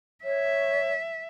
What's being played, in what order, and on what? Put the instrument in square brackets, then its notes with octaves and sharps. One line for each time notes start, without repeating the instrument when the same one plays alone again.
[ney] C#5 [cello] E5